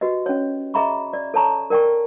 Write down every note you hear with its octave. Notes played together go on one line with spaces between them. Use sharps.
F#4 G4 B4 D#5
C#4 C#5
G#4 D#5 E5 A#5 B5 C#6
D5
A4 C#5 A5 A#5 C#6
A#4 D5 G5 G#5 C#6